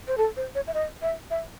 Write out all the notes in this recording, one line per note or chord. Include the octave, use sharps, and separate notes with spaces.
C5
A4
C5
C#5
E5
D#5
E5
E5